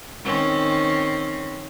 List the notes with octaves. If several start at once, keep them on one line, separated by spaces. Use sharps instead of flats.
D#3 C4 C#4